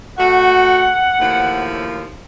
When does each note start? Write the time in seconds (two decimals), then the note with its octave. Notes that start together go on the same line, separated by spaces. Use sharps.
0.18 A3 F#4 F#5
1.20 D#2 A2 F3